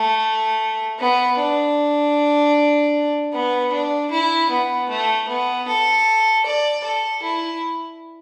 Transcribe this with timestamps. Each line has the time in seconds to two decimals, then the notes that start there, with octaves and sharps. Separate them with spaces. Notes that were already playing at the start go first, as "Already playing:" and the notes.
Already playing: A3
0.99 B3
1.38 D4
3.33 B3
3.72 D4
4.11 E4
4.50 B3
4.89 A3
5.28 B3
5.67 A4
6.45 D5
6.84 A4
7.23 E4